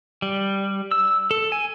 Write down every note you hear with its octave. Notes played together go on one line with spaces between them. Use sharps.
G3
E6
A4
G#5